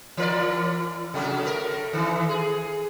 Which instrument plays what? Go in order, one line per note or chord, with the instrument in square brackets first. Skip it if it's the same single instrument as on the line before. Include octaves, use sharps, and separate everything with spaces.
[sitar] E3 A#4 D5
C3 F#3 A3
A3 A#4
D#3 E3
G#4